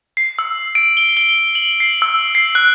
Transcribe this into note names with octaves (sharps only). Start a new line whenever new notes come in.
C7
E6
D7
G7
G7
F#7
C7
E6
C7
F#6